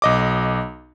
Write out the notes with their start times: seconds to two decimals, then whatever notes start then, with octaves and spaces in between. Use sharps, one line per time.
0.02 B1 D#5 D6